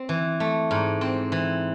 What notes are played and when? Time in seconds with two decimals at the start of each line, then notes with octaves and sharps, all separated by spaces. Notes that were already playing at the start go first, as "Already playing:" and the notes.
Already playing: C4
0.09 E3
0.40 A3
0.71 G#2
1.01 C4
1.32 E3